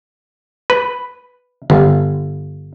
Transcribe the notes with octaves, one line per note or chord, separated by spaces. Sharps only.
B4
G1